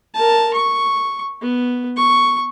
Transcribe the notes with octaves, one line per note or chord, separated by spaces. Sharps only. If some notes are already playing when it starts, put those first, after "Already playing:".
A#4 A5
C#6
B3
C#6